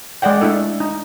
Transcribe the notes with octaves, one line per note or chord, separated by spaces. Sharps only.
G#3 G#4 D5 F#5 G5
A3 D4 E4 A4
D#4